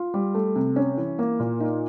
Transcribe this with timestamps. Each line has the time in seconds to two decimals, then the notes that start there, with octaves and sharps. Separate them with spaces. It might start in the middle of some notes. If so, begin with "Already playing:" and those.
Already playing: F4
0.14 G3
0.34 A3
0.56 C3
0.76 C#4
0.97 E3
1.19 A#3
1.40 A#2
1.60 D#4